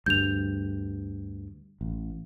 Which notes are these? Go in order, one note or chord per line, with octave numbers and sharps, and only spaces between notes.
D2 G2 G6 F7
A1